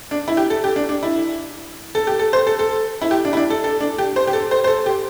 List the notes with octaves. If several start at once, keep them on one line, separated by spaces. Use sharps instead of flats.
D4
E4
G4
A4
G4
D4
D4
E4
A4
G4
A4
C5
A4
A4
E4
G4
D4
E4
D4
A4
A4
D4
G4
C5
G4
A4
C5
C5
A4
G4